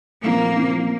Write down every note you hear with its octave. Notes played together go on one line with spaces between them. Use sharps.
A#2 F3 A#3 C4
A#2 F3 C4